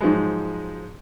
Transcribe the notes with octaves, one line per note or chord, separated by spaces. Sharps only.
G#2 F3 F#3 G#3